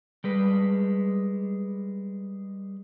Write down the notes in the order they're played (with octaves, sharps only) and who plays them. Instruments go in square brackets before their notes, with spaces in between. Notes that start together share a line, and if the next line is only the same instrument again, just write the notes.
[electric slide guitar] G3 G#3 B4